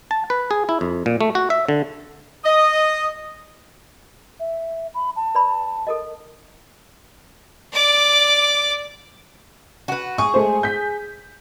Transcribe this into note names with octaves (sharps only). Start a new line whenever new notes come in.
A5
B4
G#4
E4
F2
A#2
A3
F#4
E5
D3
D#5
E5
B5
A5
B4 D5 B5
A4 A#4 D#5
D5 D6
F#4 B4
G#4 C#6
G#3 A3 C5
G6 B6